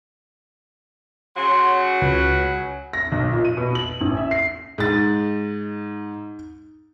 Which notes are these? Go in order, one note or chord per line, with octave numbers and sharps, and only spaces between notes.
C#3 F#3 F#4 C6
C#2 B4
A#6
B1
A#2
D#7
B2
F#7
A1
E5
C7
G#2 D#4 G#4 A6